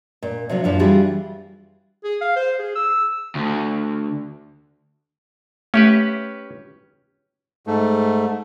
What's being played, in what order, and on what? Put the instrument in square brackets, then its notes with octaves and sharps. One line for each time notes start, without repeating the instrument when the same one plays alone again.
[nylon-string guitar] A#2
C3 F3 F#3 D4
F#2 A#2 F3 D4 E4
E3 G3 D4 F4 F#4 G#4
[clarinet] G#4
F5
C5
G#4
E6
[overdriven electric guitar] D2
[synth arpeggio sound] A3 [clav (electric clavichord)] C#4 G4 B4
[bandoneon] G#2 A3